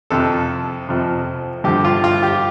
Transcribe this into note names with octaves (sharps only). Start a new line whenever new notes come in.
F2 C3 F3 A4
F2 C3 F3
G2 D3 F3 G4
F4
F4
G4